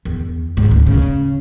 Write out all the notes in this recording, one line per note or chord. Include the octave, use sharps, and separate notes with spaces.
E2
G#2
D2
C#3